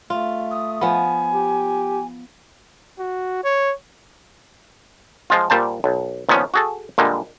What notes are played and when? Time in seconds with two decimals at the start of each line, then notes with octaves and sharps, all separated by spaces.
0.10 A3 F4
0.50 D#6
0.81 F3 B3 G#5
1.33 G4
2.99 F#4
3.44 C#5
5.30 F3 G#3 F4
5.50 A#2 G3 C5 A5
5.84 B1
6.29 A#2 D#3 F3 B3 C#4
6.54 F#4 G#4 A4
6.98 A#2 D3 G3 G#3